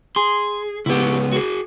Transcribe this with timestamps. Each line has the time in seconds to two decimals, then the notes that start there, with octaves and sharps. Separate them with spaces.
0.16 G#4 C6
0.86 C#2 B3 E4 G4
1.32 F#4 G#4